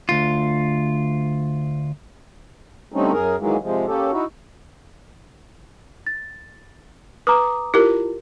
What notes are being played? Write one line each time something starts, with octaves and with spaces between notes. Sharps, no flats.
D2 F4
D3 G3 A3 C4 C#4 D#4
F#2 G#4 A#4
D#3 E3 F#3 G#3 A#3
C3 F3 G#3
A#3 C#4 G4 A4
D#4 E4 F#4
A6
B4 A#5 D6 D#6
E4 F4 G4 A#4